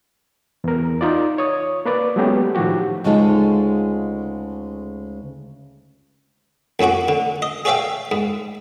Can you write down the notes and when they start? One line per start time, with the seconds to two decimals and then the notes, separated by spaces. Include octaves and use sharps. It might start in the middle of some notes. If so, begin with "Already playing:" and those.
0.64 E2 A#4
1.01 D#4 F4 D5
1.38 C#5 D#6
1.86 A#3 B4 D5
2.16 F#3 G#3 A3 B3 C#4 G4
2.55 A2 D#3 F3 F#4 G4
3.04 D2 C#3 G#3 D#4 F4 A4
6.79 F2 A2 C#4 F#4 D6
7.08 D3
7.42 D#5
7.65 G#4 C#5 D5 E5 F5 G5
8.11 G#2